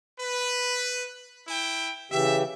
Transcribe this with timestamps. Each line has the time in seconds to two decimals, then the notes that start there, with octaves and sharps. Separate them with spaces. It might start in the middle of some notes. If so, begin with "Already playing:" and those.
0.20 B4
1.47 E4 G5
2.12 C#3 E3 G4 E5